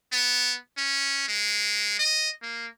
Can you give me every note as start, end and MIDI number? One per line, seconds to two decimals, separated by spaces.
0.12 0.56 59
0.77 1.24 61
1.28 1.96 56
1.99 2.30 75
2.42 2.67 58